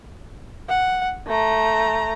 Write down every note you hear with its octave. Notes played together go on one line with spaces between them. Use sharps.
F#5
A3 A#5